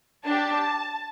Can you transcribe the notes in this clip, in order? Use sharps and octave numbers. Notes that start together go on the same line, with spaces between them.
D4 G4 A5